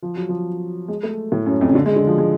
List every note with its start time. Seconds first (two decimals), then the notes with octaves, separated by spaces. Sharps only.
0.03 F3
0.16 F#3
0.29 F3
0.88 G#3
1.03 A3
1.32 A2
1.46 F#2
1.61 F2
1.68 C#3
1.75 D3
1.86 G#3
1.96 D3
2.07 F3
2.18 G#3